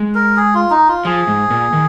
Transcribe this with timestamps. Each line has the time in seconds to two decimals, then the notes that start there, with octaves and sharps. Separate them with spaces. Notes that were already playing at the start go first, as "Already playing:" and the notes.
Already playing: G#3
0.15 A#4
0.36 G#4
0.54 F4
0.71 D#4
0.88 F4
1.05 F3 G#4
1.27 G#2
1.50 A#2
1.73 D#3